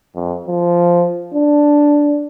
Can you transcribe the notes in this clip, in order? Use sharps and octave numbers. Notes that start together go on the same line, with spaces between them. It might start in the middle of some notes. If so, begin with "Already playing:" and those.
F2
F3
D4